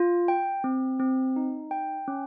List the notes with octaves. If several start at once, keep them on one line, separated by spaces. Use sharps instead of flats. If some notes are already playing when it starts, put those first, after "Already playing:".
Already playing: F4
G5
C4
C4
D#4
G5
C#4